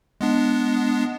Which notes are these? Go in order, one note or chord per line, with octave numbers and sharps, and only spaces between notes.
G#3 B3 D4